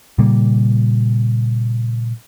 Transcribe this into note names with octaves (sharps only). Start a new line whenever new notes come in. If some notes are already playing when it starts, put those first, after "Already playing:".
A#2 C#3 G3 A#3